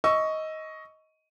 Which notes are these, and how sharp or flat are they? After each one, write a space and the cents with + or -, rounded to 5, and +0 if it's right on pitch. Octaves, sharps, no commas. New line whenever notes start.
D#5 +15 C#6 +10 E6 +10